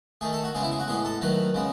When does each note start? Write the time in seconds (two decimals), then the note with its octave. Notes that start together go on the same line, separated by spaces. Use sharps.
0.21 D#3 A3 G#4
0.33 A4
0.44 F#4
0.54 C#3 G#3 B3 G#4
0.63 E4
0.71 G#4
0.79 F#4
0.88 A2 G#3 B3 G#4
1.05 A4
1.21 D#3 F#3 A3 B4
1.54 C#3 G#3 B3